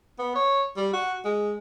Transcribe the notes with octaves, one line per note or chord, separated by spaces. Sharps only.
B3
C#5
G3
F#4
G#3